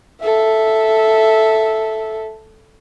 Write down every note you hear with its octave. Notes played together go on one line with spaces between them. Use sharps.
A4 E5